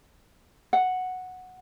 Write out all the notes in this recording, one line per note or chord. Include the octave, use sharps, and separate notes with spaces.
F#5